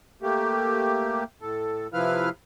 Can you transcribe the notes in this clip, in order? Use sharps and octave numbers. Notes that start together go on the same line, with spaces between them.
A3 A#3 G4
A2 A4
C3 F3 E4 B4 F5 F6